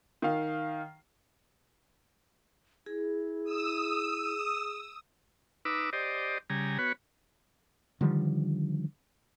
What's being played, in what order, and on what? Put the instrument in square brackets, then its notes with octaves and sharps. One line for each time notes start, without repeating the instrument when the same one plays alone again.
[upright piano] D#3 F5
[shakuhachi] E4 [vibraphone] G#4
[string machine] D#6 E6
[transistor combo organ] D#4 B4 D6 E6
G4 C5 D5 D#5
C#3 G3 G#5 A#5
B3 F#4 B4 C#5
[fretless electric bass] D3 D#3 F3 G3